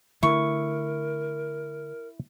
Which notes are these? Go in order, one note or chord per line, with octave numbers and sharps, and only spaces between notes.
D3 A3 E4 A#4 C#6